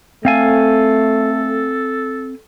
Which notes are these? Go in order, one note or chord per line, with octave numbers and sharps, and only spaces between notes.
A3 C4 A4 F5 G#5